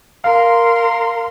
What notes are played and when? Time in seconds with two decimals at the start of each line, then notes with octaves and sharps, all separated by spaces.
0.24 A#4 F5 C6